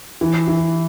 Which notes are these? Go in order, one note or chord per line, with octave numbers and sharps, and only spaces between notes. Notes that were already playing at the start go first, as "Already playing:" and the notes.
E3
E3